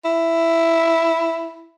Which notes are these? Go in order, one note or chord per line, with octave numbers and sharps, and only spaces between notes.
E4